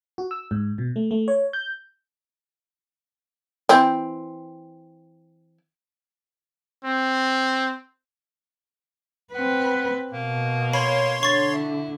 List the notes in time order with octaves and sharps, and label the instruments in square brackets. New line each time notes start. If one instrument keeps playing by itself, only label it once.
[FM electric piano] F#4
E6
G#2
B2
A3
A3
C#5
G6
[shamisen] E3 C4
[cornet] C4
[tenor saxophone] B3 [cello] C4 B4
[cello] B2 [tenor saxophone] A#3
[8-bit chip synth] C#5 C6 [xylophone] B5
[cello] D3 [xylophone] C#6 A6
[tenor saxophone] E4